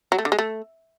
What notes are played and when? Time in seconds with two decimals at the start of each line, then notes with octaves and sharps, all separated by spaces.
0.12 F#3
0.18 A3
0.25 D3
0.32 G#3
0.39 A3